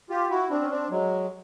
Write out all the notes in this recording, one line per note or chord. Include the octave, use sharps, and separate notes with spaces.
F4 G4
E4 F#4
C4 D4
C#4
C4 D4
F#3 G#3